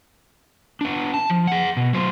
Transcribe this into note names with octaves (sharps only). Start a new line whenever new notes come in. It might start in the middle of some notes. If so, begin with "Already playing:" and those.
B3 D4
A5
F3
G#4 F#5
B2
F#3 C5